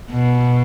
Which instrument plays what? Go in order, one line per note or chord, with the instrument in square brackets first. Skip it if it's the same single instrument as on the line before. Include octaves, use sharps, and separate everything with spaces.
[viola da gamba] B2